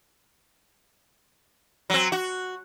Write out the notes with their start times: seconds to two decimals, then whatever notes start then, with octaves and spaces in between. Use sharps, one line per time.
1.90 F#3 C4
2.12 F#4